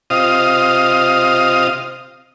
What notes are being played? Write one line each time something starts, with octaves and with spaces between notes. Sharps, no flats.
C3 F4 D#5 F5 D#6